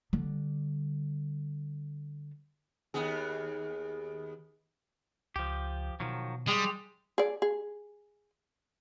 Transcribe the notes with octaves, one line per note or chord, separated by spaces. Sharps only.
D3 G3
D#2 B3 G#4
C#2 F3 G4
B2 D#3 F3 F#3
G3 G#3 G4 G#4
G#4 D5
G#4